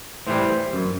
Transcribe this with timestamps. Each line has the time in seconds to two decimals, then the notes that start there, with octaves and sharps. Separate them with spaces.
0.27 A2 E3 G3 C5
0.73 F#2